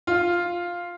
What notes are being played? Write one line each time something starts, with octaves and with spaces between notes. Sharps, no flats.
F4